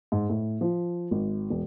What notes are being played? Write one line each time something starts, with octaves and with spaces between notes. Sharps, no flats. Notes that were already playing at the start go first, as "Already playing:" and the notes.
G#2
A2
F3
G#1
E1